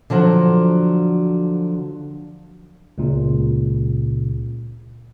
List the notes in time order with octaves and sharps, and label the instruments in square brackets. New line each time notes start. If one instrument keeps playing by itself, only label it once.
[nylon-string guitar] D3 F3 F#3 F#4
[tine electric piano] C#2 A#2 C#3